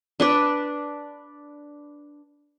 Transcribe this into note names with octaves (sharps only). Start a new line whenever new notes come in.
D4 B4 D5